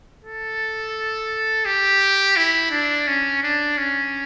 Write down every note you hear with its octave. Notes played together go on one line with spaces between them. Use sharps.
A4
G4
E4
D4
C#4
D4
C#4